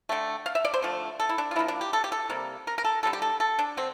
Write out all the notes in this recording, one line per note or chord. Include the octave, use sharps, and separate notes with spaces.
D3 A3 G5
F5
E5
D5
C5
D3 F3 A3
A4
E4
D4
F4
D3 F3 A#3 E4
D4
G4
A4
G4
A4
C3 G3 A#3
A#4
A#4
A4
D3 G3 A#3 A4
G4
A4
A4
D4
D3 C4